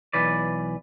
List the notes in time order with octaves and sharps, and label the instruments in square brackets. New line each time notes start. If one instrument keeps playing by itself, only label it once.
[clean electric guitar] B1 E3 B4 D5